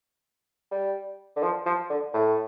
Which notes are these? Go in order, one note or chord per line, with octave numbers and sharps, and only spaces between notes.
G3
D3
F3
F3
D3
A2